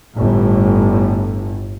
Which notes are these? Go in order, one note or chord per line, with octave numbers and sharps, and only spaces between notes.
G1 A2